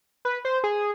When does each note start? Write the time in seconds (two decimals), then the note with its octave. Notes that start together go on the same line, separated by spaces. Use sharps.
0.25 B4
0.45 C5
0.64 G#4